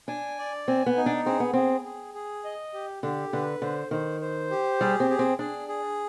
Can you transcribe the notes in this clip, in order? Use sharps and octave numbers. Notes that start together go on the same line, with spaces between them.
D4 G#5
D5
C4 G#5
B3
D#4
D4
C4 G#4
B3
C4 G#4
G#4
G#4
D#5
G4
D3 G4
D3 B4
D3 C5
D#3 C5
C5
G4
G3 G#4
C4
G#4
C4
D4 G#4
G#4